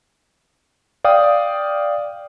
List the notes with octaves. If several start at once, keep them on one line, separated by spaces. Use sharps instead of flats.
D5 F5 G5 D#6